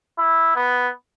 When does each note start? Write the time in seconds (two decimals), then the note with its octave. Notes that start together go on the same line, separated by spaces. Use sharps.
0.18 E4
0.56 B3